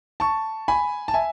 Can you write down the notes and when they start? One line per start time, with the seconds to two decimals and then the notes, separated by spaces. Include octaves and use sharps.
0.20 A5 C#6
0.68 G#5 B5
1.08 A5
1.14 E5 G#5